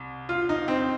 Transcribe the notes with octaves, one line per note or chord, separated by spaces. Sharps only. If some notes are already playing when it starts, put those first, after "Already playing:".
Already playing: C2
F4
D#4
C4